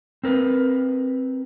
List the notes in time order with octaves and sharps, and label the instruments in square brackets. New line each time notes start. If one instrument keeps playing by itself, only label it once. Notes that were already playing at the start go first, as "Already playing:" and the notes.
[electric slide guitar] C4 A#4 B4